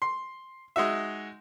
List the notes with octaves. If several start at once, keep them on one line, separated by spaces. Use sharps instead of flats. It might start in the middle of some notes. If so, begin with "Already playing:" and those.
C6
G#3 D#4 F#4 E5